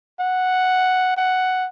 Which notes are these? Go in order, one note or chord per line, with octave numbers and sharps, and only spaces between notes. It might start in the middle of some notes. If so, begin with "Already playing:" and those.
F#5
F#5